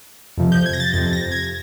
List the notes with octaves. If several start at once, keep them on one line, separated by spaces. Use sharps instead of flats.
F2 C3 F3
G6
G#6
A#6
A6
F2 C3 F3 A6
A#6
G#6